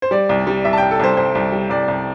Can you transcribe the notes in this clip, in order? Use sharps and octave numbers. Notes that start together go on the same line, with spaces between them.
C5
G3 D5
C2
G3
C2 E5
A5
C2 G5
A4
C2 C5
C2 C5
C2
G3
C2 D5
C2